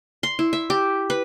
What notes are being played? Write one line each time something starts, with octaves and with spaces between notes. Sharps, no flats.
C6
E4
E5
G4
B4